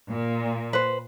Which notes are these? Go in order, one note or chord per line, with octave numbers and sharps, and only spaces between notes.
A#2
B4 C5